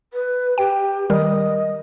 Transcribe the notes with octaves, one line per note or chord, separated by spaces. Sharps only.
B4
G4 G5
D#3 G3 A#4 D#5